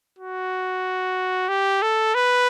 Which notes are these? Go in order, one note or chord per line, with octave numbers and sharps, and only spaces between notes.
F#4
G4
A4
B4